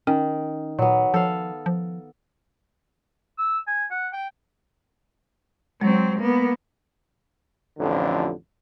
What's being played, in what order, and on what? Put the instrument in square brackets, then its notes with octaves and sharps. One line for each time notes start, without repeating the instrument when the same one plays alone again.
[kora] D#3 [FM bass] C#4
[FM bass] A#2 [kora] F#3 B3
[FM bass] F3 [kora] A4 F5
[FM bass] F3
[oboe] E6
G#5
F#5
G5
[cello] F#3 C4 [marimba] G#3
[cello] A#3 B3
[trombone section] A1 F2 D3 F3